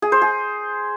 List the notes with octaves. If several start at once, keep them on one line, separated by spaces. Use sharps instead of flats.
G#4
C5
G#4